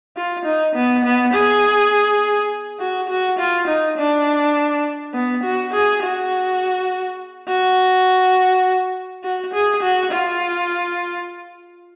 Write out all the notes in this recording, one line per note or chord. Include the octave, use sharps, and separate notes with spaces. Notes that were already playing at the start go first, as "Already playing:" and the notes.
F4
D#4
B3
B3
G#4
F#4
F#4
F4
D#4
D4
B3
F#4
G#4
F#4
F#4
F#4
G#4
F#4
F4